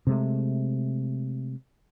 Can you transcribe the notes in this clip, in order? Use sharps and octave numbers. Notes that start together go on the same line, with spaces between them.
C3 G#3 A3